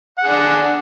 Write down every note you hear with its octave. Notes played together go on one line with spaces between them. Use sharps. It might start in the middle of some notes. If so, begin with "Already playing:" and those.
D4 G#4 F#5